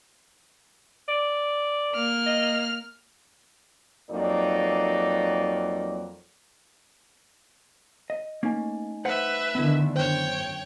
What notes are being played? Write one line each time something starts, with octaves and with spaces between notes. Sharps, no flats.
D5
A#3 F6
D#5
F2 F#3 A#3 D#4 D5
D#5
A3 A#3 C#4 D#4 G#5
B4 C5 E5 F#5
D3 D#3 B3 E4
F#2 C5 C#5 G5